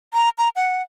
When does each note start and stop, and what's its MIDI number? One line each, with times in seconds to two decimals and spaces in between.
0.13 0.29 82
0.38 0.49 82
0.56 0.82 78